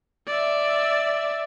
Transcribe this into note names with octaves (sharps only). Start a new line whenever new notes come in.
D5 E5